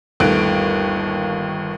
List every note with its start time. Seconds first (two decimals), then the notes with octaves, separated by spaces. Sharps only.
0.20 G1 D#2 A3 F#6 D7